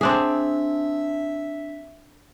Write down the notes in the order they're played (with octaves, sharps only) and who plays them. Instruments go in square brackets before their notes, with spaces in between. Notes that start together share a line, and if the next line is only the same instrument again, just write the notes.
[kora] C4 D4 G#4 [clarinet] E5